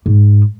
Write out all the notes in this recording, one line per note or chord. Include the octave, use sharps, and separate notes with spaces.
G#2